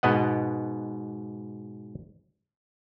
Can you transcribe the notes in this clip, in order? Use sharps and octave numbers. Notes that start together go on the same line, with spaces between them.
G#2 B2 B3 D#5 F#5